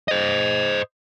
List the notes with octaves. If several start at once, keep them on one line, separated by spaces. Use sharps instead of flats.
C5 D#5